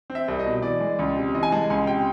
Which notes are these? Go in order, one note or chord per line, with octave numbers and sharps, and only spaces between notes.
C4
E5
C2
D#5
B2
E3 D5
G#3
C#2
C3
E3 D#5
G#5
G#3 A5
C#2 G#5
C3 G5